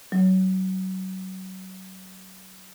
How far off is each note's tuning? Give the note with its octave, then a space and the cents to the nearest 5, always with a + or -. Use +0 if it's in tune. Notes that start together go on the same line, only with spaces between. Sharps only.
F#3 +25